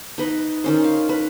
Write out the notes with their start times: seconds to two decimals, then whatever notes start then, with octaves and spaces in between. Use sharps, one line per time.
0.18 D#4 B4 D#5
0.64 D#3 C#4 C5
0.84 F5
1.09 B4